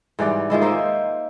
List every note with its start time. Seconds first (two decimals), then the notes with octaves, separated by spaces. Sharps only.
0.19 G#2 E3 G3 D5
0.50 D#3 F3 G#3 E4
0.62 A#3 D#4 C5 E5